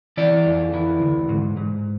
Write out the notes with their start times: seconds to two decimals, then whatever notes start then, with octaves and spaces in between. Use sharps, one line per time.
0.17 E3 D5
0.46 F2
0.74 E3
1.01 D2
1.29 G#2
1.57 G#2